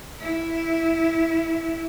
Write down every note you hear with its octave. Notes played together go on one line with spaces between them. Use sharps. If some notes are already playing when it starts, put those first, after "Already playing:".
E4